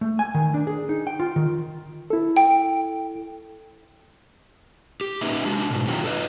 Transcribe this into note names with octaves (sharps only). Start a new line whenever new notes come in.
A3
G#5
D#3
D4
G#4
D#4
G5
F4
D#3
E4 A4
G5
G4
A#3 C#4 D#4 B4 E5
G#3 D4 F#4
G#2 B2
D#3 F#3 B3 F4 G4
A4 B4 D#5